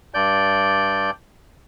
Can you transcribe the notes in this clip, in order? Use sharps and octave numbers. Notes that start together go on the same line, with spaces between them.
G2 D5 G6